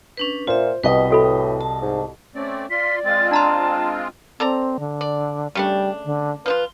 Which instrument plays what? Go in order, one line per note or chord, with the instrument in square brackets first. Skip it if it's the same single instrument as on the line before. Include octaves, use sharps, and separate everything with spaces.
[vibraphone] C#4 D4 B4
[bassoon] A#2 [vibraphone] F4 E5 [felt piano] C5
[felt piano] C2 D#5 [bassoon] B2 [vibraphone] B4 G5 D#6
[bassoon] A2 [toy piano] F#4 A4 B5
[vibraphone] A5
[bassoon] G#2
[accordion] A3 C4 D5 [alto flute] C#4
[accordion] F4 C6 [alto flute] D5 [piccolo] B6
[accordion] G#3 C4 F4 [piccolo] A6
[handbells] D4 A#5 C6 [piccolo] A5
[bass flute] C4 [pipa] A4 D5 A#5
[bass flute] D3
[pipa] D5
[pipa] C#3 A3 D4 [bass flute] G3
[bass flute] D3
[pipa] F3 D#4 F4 [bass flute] B4